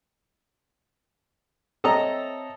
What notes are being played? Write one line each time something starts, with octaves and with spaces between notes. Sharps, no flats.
C4 A4 C#5 D#5 E5 A#5